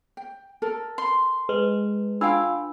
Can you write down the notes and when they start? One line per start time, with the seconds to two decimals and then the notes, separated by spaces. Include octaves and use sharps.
0.17 G5
0.62 A4 A#4
0.98 C6
1.49 G#3 B4
2.21 D4 F4 F5 G5 B5 E6